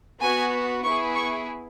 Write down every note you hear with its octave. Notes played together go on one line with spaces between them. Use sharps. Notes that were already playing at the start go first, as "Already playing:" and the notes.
B3 F#4 G#5
B3 E4 G#4 C#6
C#6